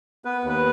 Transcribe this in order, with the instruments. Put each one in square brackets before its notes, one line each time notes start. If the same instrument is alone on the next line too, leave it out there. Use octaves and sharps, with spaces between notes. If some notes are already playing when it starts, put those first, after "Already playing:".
[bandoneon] B3 [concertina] B4
[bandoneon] D#2
[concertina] B4